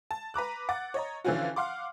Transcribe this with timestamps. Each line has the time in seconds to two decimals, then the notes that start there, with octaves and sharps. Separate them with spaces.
0.11 A5
0.34 B4 A#5 D6 F#6
0.69 F#5 D6 A6
0.94 C#5 D#5 A#5
1.24 D3 E3 F3 C#4 F4 F#4
1.56 F5 F#5 C6 D6